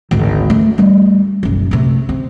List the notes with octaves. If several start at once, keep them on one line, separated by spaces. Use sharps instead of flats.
G#1 D2
A3
G3 A3
F#1 B1
C3 A3
C4